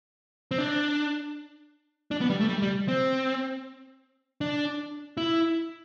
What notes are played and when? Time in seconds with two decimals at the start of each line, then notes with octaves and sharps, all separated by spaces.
0.51 C4
0.58 D4
2.11 D4
2.21 B3
2.30 G3
2.40 A3
2.49 G3
2.62 G3
2.88 C4
4.41 D4
5.17 E4